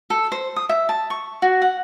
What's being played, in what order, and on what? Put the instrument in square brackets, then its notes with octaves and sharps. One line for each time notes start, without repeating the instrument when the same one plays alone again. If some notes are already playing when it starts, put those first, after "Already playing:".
[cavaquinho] A4
C5
D#6
E5
A5
C#6
F#4
F#5